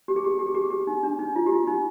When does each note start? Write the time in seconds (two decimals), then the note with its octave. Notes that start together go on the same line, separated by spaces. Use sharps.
0.08 G4
0.16 G#4
0.24 G4
0.31 G#4
0.39 G4
0.46 G#4
0.55 G4
0.63 G#4
0.70 G4
0.87 D#4
1.03 D4
1.19 D#4
1.36 F4
1.46 G4
1.52 F4
1.68 D#4